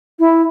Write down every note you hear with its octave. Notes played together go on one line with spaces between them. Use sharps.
E4